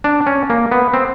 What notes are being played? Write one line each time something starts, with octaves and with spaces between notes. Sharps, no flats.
D4
C#4
A#3
B3
C4